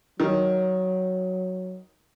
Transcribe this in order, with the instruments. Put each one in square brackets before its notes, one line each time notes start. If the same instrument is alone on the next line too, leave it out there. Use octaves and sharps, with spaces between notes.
[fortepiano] D#3 [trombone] F#3